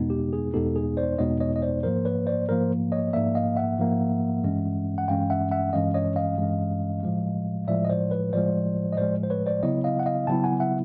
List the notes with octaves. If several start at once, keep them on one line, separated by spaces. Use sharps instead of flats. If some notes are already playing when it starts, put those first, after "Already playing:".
Already playing: E2 B2 G#3 B3 D#4
G4
G#4
E2 B2 G#3 B3 D#4 G4 A4
G#4
C5 D5
E2 B2 G#3 B3 D#4 C#5 D#5
C#5 D#5
D#5
C5 D5
G#2 F3 A#3 A#4 C5
B4 C#5
C5 D5
G#2 F3 A#3 A#4 C5
C#5 D#5
G#2 F3 A#3 D5 E5
D#5 F5
E5 F#5
G#2 F3 A#3
G2 E3 G#3 C#4
F#5
G2 E3 G#3 C#4 F5 G5
E5 F#5
E5 F#5
G2 E3 G#3 C#4 D#5 F5
C#5 D#5
D#5 F5
G2 E3 G#3 C#4
A2 F3 G#3
A2 F3 G#3 D5 E5
D#5
C5 D5
B4 C#5
A2 F3 G#3 C5 D5
D#5
A2 F3 G#3 C5 D5
C5
B4 C#5
C5 D5
C#3 F#3 B3 E4 C#5 D#5
D#5 F5
F#5
D#5 F5
C#3 F#3 B3 E4 G5 A5
F#5 G#5
E5 F#5